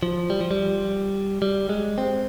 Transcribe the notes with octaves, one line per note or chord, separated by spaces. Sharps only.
F3
G3
F3
G3
G3
G#3
C4